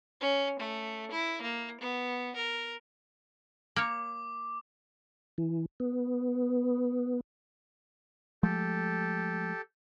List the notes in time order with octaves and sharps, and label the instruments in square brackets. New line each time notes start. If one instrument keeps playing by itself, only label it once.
[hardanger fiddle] C#4
A3
E4
A#3
B3
A#4
[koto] A#3 C#5 [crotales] D6
[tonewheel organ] E3
B3
[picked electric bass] F3 G#3 A3 [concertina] G4 A4